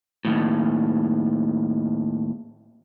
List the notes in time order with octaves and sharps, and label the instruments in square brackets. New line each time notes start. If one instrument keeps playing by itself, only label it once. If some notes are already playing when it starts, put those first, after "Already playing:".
[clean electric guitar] D#2 A2